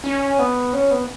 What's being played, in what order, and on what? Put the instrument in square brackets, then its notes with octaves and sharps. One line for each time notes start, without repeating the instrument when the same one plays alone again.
[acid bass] C#4
B3
C#4
B3